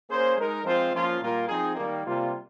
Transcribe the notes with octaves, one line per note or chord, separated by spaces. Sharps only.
A#3 C#4 G#4 C5
G#3 D#4 A#4
F3 G#3 C4 F4 C5
F3 A#3 C#4 F4
A#2 G3 A#3 F4 A#4
F3 C4 D#4 G#4
D#3 G3 A#3
C3 G3 A#3 F4